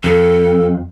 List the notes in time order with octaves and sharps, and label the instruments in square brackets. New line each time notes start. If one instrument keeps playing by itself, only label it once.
[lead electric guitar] F2 [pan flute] A4